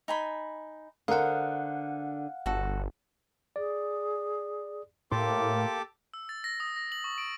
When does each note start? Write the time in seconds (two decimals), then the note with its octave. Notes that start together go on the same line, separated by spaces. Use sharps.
0.08 D#4 G#5 B5
1.08 D3 A#4 C5 F5 F#5 D#6
2.46 G1 F#4 A4
3.56 G#4 D5
5.12 A2 A#3 G4 A4 C6 D6
6.14 E6
6.29 A6
6.44 A#6
6.60 D#6
6.76 A#6
6.92 F#7
7.04 C#6
7.18 D7